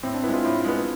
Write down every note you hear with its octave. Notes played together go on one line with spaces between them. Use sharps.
A2 C4
D4
G#3 B3 E4
F4
A2
G#3 B3